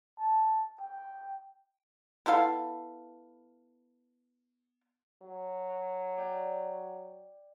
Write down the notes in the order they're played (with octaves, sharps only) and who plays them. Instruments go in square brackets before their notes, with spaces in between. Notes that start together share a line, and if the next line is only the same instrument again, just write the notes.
[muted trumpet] A5
G5
[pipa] B3 E4 A4 F5
[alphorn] F#3
[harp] D5 G5